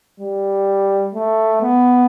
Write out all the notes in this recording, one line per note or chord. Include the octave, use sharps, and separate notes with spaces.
G3
A3
B3